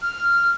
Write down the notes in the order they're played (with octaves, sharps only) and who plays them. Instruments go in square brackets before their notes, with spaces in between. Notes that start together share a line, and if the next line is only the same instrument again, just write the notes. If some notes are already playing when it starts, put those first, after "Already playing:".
[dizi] F6